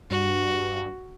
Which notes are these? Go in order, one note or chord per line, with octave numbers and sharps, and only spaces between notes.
G2 F#4